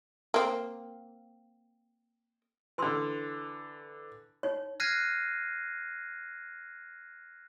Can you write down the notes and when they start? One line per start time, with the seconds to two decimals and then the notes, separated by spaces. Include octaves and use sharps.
0.34 A#3 C4
2.78 D3 E3 B4 C6 E6
4.43 D#4 C#5
4.80 F6 F#6 G#6 A#6 C7 D#7